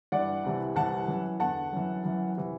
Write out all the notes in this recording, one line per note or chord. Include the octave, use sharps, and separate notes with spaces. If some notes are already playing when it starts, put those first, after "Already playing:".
G2 E3 D5 F#5
C2 C3 E3
C2 C3 E3 F#5 A5
F#2 E3
E2 D3 F#5 A5
F#2 E3
F#2 E3
C3 E3